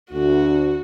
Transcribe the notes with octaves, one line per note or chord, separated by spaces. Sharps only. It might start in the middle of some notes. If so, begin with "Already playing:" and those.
D2 F#4